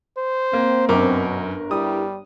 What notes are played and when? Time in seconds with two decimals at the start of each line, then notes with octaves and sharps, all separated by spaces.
0.17 C5
0.53 A#3 C4
0.89 G1 F#2 B2 A#4 D6
1.71 G3 E4 G4 D#6